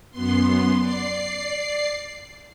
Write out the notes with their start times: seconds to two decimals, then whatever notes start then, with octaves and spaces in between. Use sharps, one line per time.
0.11 F#2 B3 C6
0.79 D5 C7